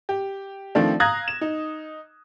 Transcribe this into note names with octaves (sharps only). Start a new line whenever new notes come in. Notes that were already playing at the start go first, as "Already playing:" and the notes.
G4
D#3 F3 A3 C4 D4
F5 A#5 D#6 F#6 G#6 A#6
E7
D#4